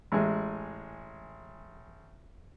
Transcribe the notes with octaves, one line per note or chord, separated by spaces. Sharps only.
A1 G#3